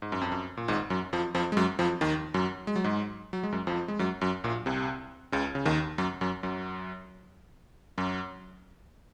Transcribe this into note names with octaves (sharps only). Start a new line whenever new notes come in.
G#2
F#2
F2
F#2
A#2
G#1 G#2
F#2 F#3
F2 F3
F2 F3
G#3
F#2 F#3
F2 F3
D#2 D#3
F#2 F#3
G#3
F#3
G#2 G#3
F#3
G#3
F#2 F#3
F2 F3
G#3
F#2 F#3
F#2 F#3
A#1 A#2
C2 C3
C#2 C#3
C#3
D#2 D#3
F#2 F#3
F#2 F#3
F#2 F#3
F#2 F#3